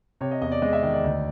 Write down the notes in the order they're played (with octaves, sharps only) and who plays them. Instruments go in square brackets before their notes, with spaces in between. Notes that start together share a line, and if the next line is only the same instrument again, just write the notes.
[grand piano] C3 C#5
D#5
E2 D#5
D5
G#3 D#5
E5
D#3 D#5
D5
D2